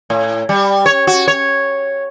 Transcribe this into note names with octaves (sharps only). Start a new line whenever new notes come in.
A2
G3
C#5
F#4
C#5